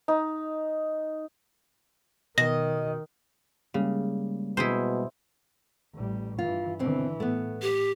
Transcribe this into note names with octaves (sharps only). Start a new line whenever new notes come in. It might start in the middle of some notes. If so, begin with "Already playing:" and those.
D#4
B2 D#3 D#5 A#6
C#3 G3 G#3 A#3
B2 E4 G#4 C5
A1 G3
G2 E3 F4
B2 D3 E3 C4
A2 A3 B3
G4